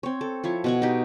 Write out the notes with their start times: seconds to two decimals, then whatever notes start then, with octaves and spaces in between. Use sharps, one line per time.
0.03 C4 C#5
0.21 A4
0.44 F3 E4 C#5
0.64 B2 F#5 C#6
0.82 D#4 G4